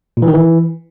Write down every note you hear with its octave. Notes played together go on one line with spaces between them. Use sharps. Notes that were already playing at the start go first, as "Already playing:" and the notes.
A#2
E3
D#3
E3